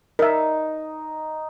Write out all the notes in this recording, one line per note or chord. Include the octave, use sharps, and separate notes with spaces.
D#4 A#4 E5